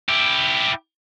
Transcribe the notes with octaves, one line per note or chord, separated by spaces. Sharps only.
E4 G4